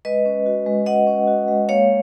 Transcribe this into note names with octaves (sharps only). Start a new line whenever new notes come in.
G#3 B4 D#5
C#4
F#4
G#3
G#3 D#5 F#5
C#4
F#4
G#3
A#3 C#5 F5